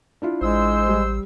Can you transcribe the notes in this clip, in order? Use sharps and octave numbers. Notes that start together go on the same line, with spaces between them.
D4 E4 F4
A1 G#3 C5 E6
G3